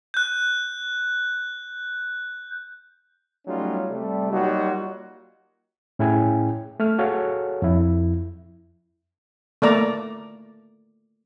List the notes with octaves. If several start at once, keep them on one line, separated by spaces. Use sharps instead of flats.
F#6 G6
F#3 G3 A3 C#4 D#4 F4
C3 G3 A3
F#3 G3 A#3 D#4 F4 F#4
A2 C#4 E4 G#4 G5 G#5
A3 F6
F#4 G#4 A4 C#5 F5
F2 E4
A3 A#3 D5 A#5